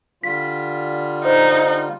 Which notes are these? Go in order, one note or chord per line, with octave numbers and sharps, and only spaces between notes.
D3 G3 F4 B6
D#4 C5